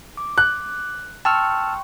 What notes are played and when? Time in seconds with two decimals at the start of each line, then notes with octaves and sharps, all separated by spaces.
0.17 D6
0.38 F#6
1.25 G5 A5 C6 C#6 E6 F6